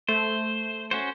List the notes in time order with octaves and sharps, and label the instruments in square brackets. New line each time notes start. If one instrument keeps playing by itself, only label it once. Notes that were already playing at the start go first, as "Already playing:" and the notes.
[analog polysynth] A3 [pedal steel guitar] C5
[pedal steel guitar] C#4 F#4 C5